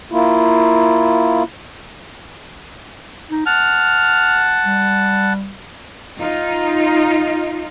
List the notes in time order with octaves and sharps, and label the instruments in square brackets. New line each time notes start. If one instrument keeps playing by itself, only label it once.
[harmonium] A#3 E4 F4
[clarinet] D#4
[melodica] F#5 A5 [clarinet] F6
[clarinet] G3
[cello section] D#4 F4